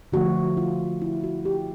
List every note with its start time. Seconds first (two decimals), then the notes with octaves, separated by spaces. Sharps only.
0.13 D3 F3 A3 F#4
0.57 F4
1.02 E4
1.24 F#4
1.45 G4